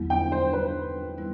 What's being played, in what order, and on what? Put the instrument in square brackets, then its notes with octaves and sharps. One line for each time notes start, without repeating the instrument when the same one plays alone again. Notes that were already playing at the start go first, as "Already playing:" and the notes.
Already playing: [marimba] E2 D3 F#3 B3 E4
[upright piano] G5
C5
B4
[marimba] E3 G3 B3 E4